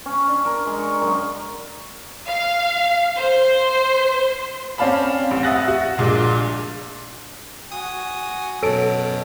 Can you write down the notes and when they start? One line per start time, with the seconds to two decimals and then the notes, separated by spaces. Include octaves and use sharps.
0.06 C#4
0.28 D4
0.45 A#4
0.66 G#3
0.79 C#6
1.01 F#2
2.26 F5
3.17 C5
4.78 C4 C#4 D5 F5 A5 B5
5.31 A1
5.43 E5 F#5 D#6 F#6 A6 A#6
5.68 F#4
5.98 A#1 A#2 G#3 D4
7.72 F#4 G#5 D#6
8.63 F#2 B2 A4 C#5 A5 D7